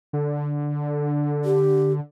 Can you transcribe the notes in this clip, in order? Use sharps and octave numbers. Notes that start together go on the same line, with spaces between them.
D3
G4